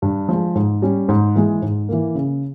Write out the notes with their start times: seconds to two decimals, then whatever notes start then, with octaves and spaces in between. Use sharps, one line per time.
0.02 G2
0.29 F3 G#3
0.55 G#2
0.82 G3 C#4
1.09 G#2
1.36 E3 G#3
1.62 G#2
1.89 E3 A#3
2.15 C#3